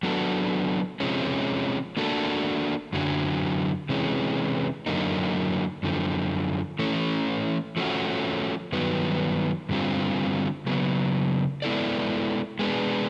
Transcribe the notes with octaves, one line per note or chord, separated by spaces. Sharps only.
F#3 B3 D4 F#4 A4
C3 F3 G#3 C#4
A#3 D4 F#4 A4
F#2 D3 F#3
C3 E3 G#3 C#4
F#2 D3 F#3 A#3 D#4
F#2 D3 F3
E3 A3 C#4
F3 A3 C#4 F#4
G2 D#3 F#3 B3
G2 D3 G3 C4 F4
C#3 F#3 B3
G#3 B3 E4 A4 D5
G#3 B3 D4